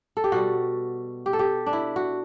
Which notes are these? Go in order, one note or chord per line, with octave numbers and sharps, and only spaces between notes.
A4
G4
B2 G3 F#4
G4
A4
G4
D4
E4
F#4